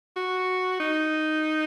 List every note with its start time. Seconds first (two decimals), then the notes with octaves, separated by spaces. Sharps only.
0.17 F#4
0.80 D#4